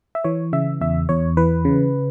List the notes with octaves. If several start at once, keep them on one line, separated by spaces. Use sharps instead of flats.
E5
E3 C#5
C#3 E5
E2 E5
E2 C#5
E3 B4
C#3